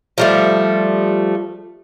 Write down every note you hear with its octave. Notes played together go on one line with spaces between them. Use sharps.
F3 G3 A3